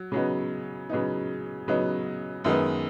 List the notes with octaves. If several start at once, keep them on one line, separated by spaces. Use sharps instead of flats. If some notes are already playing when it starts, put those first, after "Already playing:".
Already playing: F#3
C#3 F#3 B3 D#4
C#3 F#3 B3 D#4
C#3 F#3 B3 D#4
F#2 D#3 G#3 B3